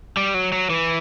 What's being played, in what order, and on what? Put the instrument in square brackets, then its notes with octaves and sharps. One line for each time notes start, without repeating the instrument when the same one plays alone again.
[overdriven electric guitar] G3
F#3
F#3
E3